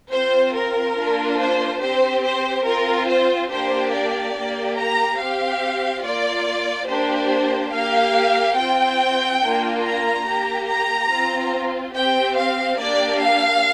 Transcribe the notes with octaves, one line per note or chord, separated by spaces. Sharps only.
C4 F4 C5
A#4
A#3 D4 F4
C5
C4 G4 C5
C5
C4 F4 A#4
C5
A#3 D4 G4 C5
D5
A#3 G4
A#5
C4 G4 F5
A#3 F4 D5
A#3 D4 G4 C5
A#3 G4 F5
C4 F4 G5
A#3 D4 F4
A#5
A#3 G4
A#5
C4 F4
C4 G4 G5
F5
A#3 D4 G4 D5
F5